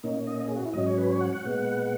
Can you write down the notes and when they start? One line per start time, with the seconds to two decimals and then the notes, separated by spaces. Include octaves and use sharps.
0.03 A#2 A#3 C#4 D#4
0.27 D#5
0.39 D#5
0.47 G#4
0.56 F#4
0.65 E4
0.73 G#2 F#3 C#4 D#5
0.86 C#5
0.98 B4
1.10 C#5
1.21 F#5
1.33 F#5
1.45 A#2 G#3 B3 F#5